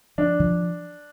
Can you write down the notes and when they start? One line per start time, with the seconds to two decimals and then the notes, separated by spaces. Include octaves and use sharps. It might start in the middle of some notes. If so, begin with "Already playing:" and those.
0.18 F3 D4
0.40 F3